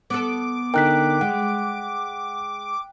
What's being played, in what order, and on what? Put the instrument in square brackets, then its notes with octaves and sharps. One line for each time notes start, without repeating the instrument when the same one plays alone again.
[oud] B3 A4 [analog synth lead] D6
[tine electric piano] D3 D#4 A#4 [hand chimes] G5 F#6 B6
[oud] G#3 [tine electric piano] F#5